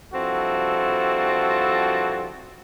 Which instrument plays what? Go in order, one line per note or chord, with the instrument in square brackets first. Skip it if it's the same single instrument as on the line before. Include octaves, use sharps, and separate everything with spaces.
[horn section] G2 F3 C4 E4 F#4 A4